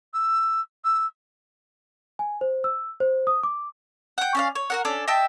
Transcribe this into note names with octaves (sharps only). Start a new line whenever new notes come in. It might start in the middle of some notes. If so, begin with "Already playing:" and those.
E6
E6
G#5
C5
E6
C5
D#6
D6
F#5 G5
C#4 D5 F5
C#5
F#4 A#4 F#5
C#4 D4 A4 D5
D#5 E5 G5 A5